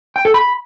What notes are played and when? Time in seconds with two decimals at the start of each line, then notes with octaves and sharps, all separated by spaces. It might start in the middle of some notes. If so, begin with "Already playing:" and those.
0.16 G5
0.25 A4
0.34 B5